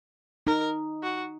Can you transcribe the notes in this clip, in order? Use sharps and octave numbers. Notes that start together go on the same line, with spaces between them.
D#4 A#4
F#4